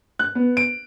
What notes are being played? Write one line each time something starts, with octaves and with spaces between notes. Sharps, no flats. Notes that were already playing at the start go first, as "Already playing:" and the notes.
F#6
B3
D7